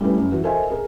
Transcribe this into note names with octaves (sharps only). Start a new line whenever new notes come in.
G3 A3 C#4 E4 B4
F#2
E3 F#4
A4 A#4 C5 D#5 E5 G#5
G#4 A#4